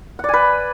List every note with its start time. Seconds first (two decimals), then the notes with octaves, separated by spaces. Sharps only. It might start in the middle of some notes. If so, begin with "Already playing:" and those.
0.19 F#5
0.24 D5
0.29 G#5
0.33 B4